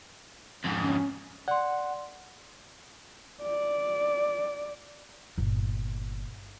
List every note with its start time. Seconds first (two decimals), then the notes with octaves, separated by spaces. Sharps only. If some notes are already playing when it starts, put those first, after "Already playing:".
0.65 F2 G#2
0.83 C#4
1.48 D5 F#5 C6
3.42 D5
5.38 G1 A#2